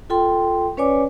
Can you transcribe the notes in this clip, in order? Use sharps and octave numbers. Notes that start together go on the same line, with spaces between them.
F4 A4 G5 C6
C#4 B4 C#5 D5 G#5 D6